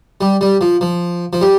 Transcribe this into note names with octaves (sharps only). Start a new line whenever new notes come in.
G3
G3
F3
F3
F3
G3